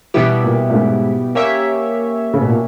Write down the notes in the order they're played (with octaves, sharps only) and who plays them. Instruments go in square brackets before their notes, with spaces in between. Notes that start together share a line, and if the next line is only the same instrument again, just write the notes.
[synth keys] B2 G3 B3 E4 G4 [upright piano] E3
[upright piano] A#2
A#2
G#2
[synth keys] A#3 C#4 G4 C#5 E5
[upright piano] C#3
B2
A#2